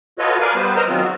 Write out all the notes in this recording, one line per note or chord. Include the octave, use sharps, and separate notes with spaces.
F4 F#4 A4 B4 C#5 D#5
A#4 B4 D5 F5 G#5
G3 B3 B4 C5
A#4 C5 D#5 A#5 E6 F6
D#3 F#3 G#3 B3 C4 F4
F#4